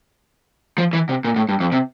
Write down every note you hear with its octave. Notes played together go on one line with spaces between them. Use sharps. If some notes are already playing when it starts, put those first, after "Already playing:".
F3
E3
C3
A#2
A2
G2
F2
C3